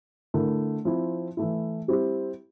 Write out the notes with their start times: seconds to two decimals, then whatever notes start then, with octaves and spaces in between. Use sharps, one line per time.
0.34 D3 A3 E4 A#4
0.85 F3 C4 E4
1.37 E3 A3 E4
1.88 G3 C4 E4 G4